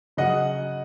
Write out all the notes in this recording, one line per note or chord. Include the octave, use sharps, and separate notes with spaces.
C#3 F#3 D#5 F#5